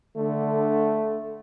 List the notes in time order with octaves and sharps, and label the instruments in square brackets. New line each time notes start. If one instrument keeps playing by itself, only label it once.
[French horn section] D3 [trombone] A3